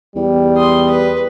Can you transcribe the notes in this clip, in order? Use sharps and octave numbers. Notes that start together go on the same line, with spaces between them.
E2 G3
C6 D#6
B4